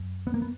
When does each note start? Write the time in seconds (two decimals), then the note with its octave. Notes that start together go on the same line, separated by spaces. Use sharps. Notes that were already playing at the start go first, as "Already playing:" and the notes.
Already playing: F#2
0.27 B3
0.34 A#3
0.42 B3